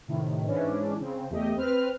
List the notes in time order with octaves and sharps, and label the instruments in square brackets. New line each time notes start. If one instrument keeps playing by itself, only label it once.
[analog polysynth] A2 C3 D#3
G#2 E3 C#4 D4
C#3 C4
E2 A3 G4 D#5
C4 B4 F6